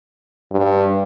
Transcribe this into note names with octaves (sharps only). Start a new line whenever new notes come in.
G2